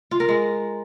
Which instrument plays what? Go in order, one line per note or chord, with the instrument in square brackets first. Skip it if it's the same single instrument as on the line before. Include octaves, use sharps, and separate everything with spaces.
[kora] F4
A#4
G#3